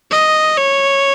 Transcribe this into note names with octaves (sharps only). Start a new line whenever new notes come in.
D#5
C#5